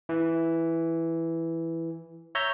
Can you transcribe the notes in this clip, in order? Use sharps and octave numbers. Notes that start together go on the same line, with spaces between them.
E3
C#5 E5 A#5 G6